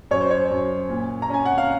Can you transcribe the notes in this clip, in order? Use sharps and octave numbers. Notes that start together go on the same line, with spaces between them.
F#2 C#5
C5
C#5
F#2
A#2
A#5
C#4 G#5
F#5
F5